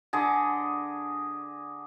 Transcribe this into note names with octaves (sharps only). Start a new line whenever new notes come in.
D3 G#4 D#5